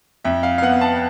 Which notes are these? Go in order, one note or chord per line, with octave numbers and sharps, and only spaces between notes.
F2 E5
F5
F5
B3 F#5
A5